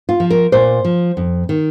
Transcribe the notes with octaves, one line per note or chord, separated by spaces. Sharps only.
F4
F3
A#4
A#2 C5
F3
F2
D#3